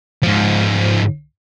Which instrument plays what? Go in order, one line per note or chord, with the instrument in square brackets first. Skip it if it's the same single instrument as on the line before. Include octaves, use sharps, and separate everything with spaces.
[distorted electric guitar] G#2 F3